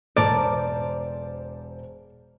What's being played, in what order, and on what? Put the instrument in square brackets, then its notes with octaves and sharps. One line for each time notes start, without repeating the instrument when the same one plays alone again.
[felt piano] E1 C5 [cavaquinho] A4 A#4 [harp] D5